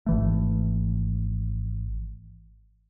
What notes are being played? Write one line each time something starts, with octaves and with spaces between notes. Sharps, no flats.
G#1 E3 A3